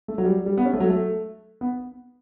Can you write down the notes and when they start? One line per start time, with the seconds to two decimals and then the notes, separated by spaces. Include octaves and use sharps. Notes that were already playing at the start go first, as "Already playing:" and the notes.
0.08 A3
0.18 F#3
0.24 G3
0.46 G3
0.57 B3
0.65 C#4
0.73 A3
0.80 F#3
0.90 A3
1.61 B3